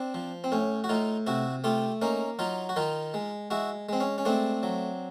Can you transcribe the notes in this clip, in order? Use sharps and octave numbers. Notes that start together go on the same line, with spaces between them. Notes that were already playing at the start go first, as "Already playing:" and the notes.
Already playing: C4 D4
F3
C4
A2 C#4
F#4
A2 D#4 F4
C3 E4 F#4
A3 F4 G4
A#3 C#4 D#4
F#3 D#4 F4
F#4
D#3 D#4 F4
G#3
G#3 E4 F#4
G#3 C4
C#4
C#4
A3 C4 D4
F#3